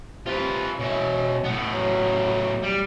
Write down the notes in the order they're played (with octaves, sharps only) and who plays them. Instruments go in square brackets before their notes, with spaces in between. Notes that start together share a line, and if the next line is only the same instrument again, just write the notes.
[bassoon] C3 [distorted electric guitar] F4 B4
[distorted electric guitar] B2 E5 [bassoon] C#4
[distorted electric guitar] A2 B3
[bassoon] F#3
[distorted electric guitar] G3